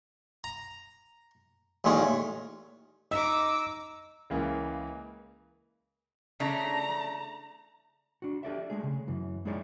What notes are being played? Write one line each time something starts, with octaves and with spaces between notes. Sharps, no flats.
A#5
A1 A#2 D#3 G#3 C#4
D#4 D#5 D6 E6
C#2 C#3 E3 A#3
C#3 A3 D4 A#5
D4 F#4
G4 A4 D5 E5
G#3 A3 G#4
C#3
F#2 E3
G#3 D#4 E4 G#4 C#5 D5